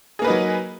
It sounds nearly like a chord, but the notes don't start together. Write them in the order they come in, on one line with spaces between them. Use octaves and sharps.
G#4 A#3 B4 D#4 F#3